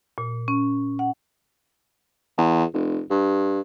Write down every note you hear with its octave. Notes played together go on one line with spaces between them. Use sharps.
A#2
C#4
F#5
E2
F1
G2